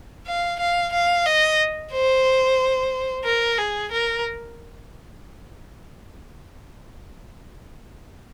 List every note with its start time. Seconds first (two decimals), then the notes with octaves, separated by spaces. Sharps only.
0.26 F5
0.59 F5
0.92 F5
1.25 D#5
1.93 C5
3.25 A#4
3.58 G#4
3.91 A#4